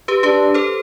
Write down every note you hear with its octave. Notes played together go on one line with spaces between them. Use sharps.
G4 B4
D4 G4 B4
A4 C5